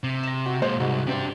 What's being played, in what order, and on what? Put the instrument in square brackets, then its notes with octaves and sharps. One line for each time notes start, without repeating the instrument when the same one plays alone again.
[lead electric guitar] C3
[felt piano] A#6 E7
F#4
[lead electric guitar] A#2 G#3 [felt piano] C5
[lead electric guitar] C2 [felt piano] G#2 F#4
[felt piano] C3 C4 [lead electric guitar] D4 G4